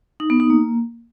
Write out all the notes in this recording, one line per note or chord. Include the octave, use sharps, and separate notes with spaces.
D#4
B3
D#4
A#3